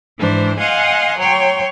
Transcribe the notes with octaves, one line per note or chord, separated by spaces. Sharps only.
G#2 E3 D4 C5
D#5 F5 F#5 G#5 C6
F#3 C#5 G5 C6